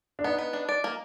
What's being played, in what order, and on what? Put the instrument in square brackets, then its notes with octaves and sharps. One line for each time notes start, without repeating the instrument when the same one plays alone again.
[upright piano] D4
[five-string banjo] B3 [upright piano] D#4
[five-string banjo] B3
D4
D5
A#3